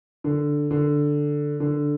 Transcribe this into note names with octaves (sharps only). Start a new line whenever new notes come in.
D3
D3
D3